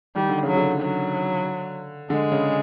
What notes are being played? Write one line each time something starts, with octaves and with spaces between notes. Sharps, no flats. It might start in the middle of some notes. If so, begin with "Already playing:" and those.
D#3 G3
D3
C#3
F#3
D3
F#3
D3 G#3
C#3